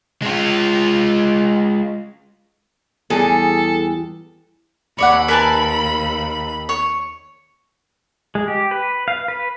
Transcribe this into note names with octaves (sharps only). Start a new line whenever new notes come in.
G#3 F4
E2 G3 G#4 A4
D#2 C#5 D5 F#5 B5
A#4 B4 G#5 A5
C#5
G#3
G4
B4
F5
B4